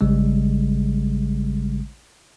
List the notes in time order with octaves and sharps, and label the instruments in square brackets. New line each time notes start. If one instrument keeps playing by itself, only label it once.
[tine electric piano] A1 C#3 G3 G#3